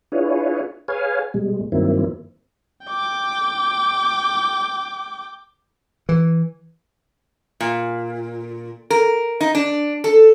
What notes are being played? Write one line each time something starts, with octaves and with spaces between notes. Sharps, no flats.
D4 E4 F4 G#4 B4 C#5
G#4 B4 C#5 F5 G#5
B2 G3 G#3
G2 D#3 F#3 A#3 C4 E4
G5 D6
E3
A#2
A#4
D#4
D4
A4